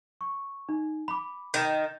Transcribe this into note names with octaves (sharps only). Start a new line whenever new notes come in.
C#6
D#4
B5 D6
D#3 G6 A6